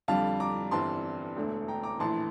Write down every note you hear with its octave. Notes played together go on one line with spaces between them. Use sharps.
F2 D3 G3 F5 A5
A#5 D6
G1 G2 E3 G3 C4 A5 C6
E1 D2 D3 A3 D4
G5 A#5
A#5 D6
A#1 A2 E3 A5 C6